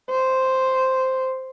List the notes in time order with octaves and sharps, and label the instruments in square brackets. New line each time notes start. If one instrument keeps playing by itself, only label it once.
[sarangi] C5